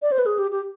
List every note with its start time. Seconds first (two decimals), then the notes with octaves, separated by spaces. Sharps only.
0.02 D5
0.12 C5
0.19 B4
0.26 G#4
0.39 G4
0.51 G4